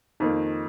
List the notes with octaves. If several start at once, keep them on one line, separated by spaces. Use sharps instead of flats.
F2 D#3 A#3 D#4